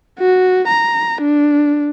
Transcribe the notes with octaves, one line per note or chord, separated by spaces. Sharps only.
F#4
A#5
D4